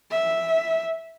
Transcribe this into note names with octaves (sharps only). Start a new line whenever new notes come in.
E5